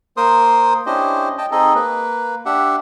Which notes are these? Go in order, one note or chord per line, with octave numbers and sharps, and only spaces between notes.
A#3 A#4 C5 C6 D#6
C#4 D4 E4 G4 C5 D#5
D#5 G5 A5
C4 D#4 G#4 A4 D#5
A#3 B4
D4 G4 E5 F#5